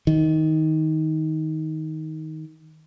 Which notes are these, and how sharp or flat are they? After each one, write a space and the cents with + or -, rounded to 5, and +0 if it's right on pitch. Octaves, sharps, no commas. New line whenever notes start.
D#3 +15